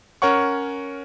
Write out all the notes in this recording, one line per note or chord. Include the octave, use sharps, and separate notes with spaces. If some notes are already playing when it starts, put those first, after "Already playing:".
C#4 A#4 C#5 F#5 C#6